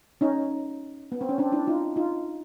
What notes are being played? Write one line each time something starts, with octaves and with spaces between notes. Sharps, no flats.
C#4 D#4
B3
C4
C#4
C4 D4
D4 E4
D#4 F4
D#4 F4